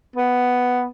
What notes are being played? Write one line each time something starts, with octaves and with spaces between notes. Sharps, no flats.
B3